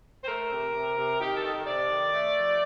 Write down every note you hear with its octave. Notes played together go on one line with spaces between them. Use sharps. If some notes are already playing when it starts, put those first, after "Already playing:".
C5
A3 A#4
C3
C3
C3
D#3 G4
A4
D#3
C3 D5
D#3
A3
F3